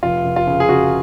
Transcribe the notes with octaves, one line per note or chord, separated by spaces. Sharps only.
F1 F4
F1
F4
C#3
G#4
C#3 F#4